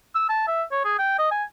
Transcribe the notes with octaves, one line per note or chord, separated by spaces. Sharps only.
E6
A5
E5
C#5
G#4
G5
D#5
G#5